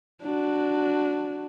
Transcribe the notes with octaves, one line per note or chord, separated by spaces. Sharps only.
D4 F#4